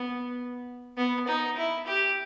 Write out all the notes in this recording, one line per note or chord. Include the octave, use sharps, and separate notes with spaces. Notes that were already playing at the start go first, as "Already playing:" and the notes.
Already playing: B3
B3
D#4
E4
G4